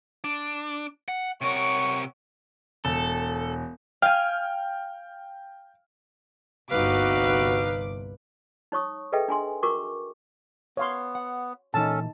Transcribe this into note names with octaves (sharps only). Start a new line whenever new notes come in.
D4
F#5
C3 A#4 C#5 F#5 C#6
E1 A4
F5 G5 G#5 F6
G1 C2 D#4 F#4 B4 F5 D6
D#4 C#5 C#6 D#6
G#4 A4 B4 D#5 E5 G5
D4 G#5 C6
F#4 A#4 C#6 D6
B3 C#5 F5 C6
F#5
A#2 E3 C#4 D#4 A4 A5